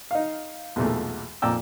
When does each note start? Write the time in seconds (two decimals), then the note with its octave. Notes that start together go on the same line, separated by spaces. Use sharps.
0.11 D#4 F5
0.76 B1 E2 A#2 A3
1.42 F2 A#2 D5 G5 E6